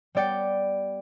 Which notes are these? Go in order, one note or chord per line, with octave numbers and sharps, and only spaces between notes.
G3 B3 D5 G5 C#7